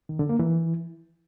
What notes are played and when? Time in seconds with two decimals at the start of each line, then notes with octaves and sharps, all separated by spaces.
0.09 D#3
0.19 D3
0.29 A#3
0.39 E3